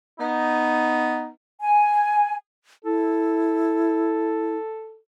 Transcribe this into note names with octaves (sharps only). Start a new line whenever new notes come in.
B3 D#4
G#5
E4 A4